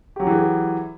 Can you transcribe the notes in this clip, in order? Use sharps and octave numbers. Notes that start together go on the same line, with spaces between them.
E3 F#3 C#4 G4 G#4